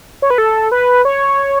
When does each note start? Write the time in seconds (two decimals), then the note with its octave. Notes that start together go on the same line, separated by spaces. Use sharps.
0.22 C#5
0.30 B4
0.38 A4
0.72 B4
1.05 C#5